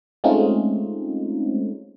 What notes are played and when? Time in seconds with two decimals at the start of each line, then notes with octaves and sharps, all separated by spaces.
0.24 G#3 A3 C4 C#4 D#4 F4